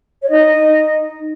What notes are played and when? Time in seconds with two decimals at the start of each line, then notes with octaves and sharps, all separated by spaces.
0.23 C#5
0.29 D#4 D#5
0.59 D#4